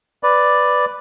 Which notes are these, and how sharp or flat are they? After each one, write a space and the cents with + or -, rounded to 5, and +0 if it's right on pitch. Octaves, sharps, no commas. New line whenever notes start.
B4 +5 D5 +0